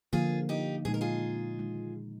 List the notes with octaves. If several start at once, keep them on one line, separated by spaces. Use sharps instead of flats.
D3 F3 A#3 F4 G#4
D#4 G4
A#2 G#3 D#4 G#4
A#4
F4 G#4
D#3 G#3 D#4